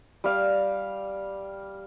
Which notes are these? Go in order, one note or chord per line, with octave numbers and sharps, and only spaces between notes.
G3 F5